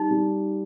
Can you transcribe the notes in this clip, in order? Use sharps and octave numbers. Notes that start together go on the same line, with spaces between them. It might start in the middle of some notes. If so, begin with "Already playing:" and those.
Already playing: G3 D#4
G3